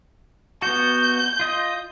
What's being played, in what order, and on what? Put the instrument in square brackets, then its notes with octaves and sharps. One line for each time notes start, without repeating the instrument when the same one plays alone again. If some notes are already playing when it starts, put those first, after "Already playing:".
[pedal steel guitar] B3 F#4 [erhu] G6
[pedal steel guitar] F4 D#5